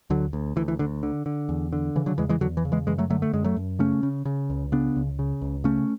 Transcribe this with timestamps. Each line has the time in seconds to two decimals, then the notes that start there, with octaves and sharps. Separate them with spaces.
0.10 D2 D3 F#3
0.33 D2
0.56 D2 E3
0.68 E3
0.79 D2 D3
1.03 D3
1.26 D3
1.49 E2
1.73 D3
1.96 C#3 E3
2.06 D3 F#3
2.18 E2 E3 G#3
2.29 E3 G#3
2.41 E2 D3 F#3
2.57 E3
2.65 C#3
2.72 E3 G#3
2.87 F#2 E3 G#3
2.98 F#3 A3
3.10 D3 F#3 A3
3.22 A3
3.33 F#2 G#3
3.44 F#3 A3
3.57 F#2
3.79 C#3 A3 C#4
4.03 C#3
4.25 C#3
4.50 C#2
4.72 C#3 B3 D4
4.96 C#2
5.19 C#3
5.42 C#2
5.64 C#3 A3 C#4